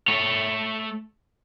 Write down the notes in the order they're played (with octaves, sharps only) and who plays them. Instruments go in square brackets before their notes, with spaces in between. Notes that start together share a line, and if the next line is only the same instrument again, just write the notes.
[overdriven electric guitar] A3 C#5